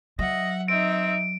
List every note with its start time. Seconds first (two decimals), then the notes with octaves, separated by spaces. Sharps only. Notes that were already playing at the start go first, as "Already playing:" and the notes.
0.19 F#3 D#5 E5 F#5
0.68 C4 D#4 E5 D7